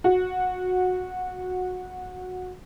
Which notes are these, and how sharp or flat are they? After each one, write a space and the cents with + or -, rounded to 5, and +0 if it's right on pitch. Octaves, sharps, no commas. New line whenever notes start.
F#4 -15